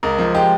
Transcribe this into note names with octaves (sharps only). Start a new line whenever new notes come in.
C#2 A#4
F3
G#3 G4